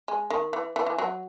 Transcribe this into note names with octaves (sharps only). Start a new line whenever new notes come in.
G#3
D#3
E3
E3
E3
F#3